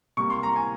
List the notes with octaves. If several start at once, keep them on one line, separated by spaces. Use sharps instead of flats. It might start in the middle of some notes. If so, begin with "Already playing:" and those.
C3 G3 A#3 C#6
C6
A#5
G#5